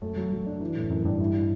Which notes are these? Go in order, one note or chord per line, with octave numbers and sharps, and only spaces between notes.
F#2 A3
F#3
F#3
D4
E3
A2
F#2 E3
G2 D4
E4
E4